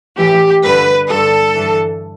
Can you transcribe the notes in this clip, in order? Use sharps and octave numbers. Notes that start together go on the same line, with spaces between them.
A2 E3 G4
G2 D3 B4
G2 D3 A4
G2 E3